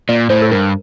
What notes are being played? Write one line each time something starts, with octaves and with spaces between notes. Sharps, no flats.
A#2 D5
A2 C5
A4
G2 A#4